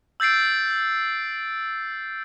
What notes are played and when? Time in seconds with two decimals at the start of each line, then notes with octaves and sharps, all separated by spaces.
0.20 E6 G6 A6 C7 D7